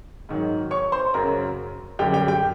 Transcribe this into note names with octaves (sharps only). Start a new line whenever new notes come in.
G#2 D#3 F#3
C#5 C#6
C5 C6
F#2 C#3 F#3 A#4 A#5
F#2 D3 G3 G4 G5
G4 G5
G4 G5